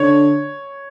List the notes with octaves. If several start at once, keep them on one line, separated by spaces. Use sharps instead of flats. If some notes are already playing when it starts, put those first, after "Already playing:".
Already playing: D3 C#5